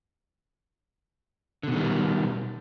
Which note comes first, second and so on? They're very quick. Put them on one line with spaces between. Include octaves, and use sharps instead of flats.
D3 B2 D#3 G3